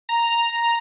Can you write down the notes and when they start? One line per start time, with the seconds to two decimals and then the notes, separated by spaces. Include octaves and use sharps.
0.09 A#5